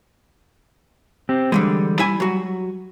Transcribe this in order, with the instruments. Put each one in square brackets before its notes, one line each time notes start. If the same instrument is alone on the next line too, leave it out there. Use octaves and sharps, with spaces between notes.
[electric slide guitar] C4 G4
[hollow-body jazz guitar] D3 E3 G#3 [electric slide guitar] G3
[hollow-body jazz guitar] E4 G#5
F#3 F#4